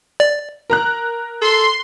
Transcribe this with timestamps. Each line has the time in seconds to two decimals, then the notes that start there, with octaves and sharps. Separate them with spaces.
0.20 D5
0.70 A#4 A#5 F#6
1.42 A4 C6